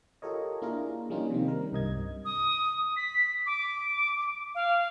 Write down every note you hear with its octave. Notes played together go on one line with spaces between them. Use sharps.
F4 G4 A4 A#4 C#5 D#5
A#3 D4 E4 F4 G#4 A#4
F3 G3 A#3 C#4 D#4 F4
C3 D#3 C4
G3 A#4
C2 G2 D#5 G#6
D#6
B6
D6
F5